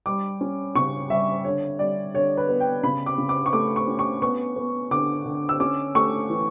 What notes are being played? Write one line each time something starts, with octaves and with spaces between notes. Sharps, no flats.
G3 D6
C#4
C#3 C#6
G3 E5
D3 C#5
G3 D5
D3 C#5
B4
B3
G5
C#3 B5
D6
C#3
D6
C#6
A3 D6
C#6
C#4
C#6
B3 C#6
B3
D3 D6
D3
E6
C#4 D6
A3 C#6
E3